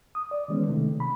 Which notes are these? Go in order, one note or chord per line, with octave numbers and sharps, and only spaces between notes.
D#6
D5
D#3 E3 G#3 B3 C#4
C3 D#3 A3
B5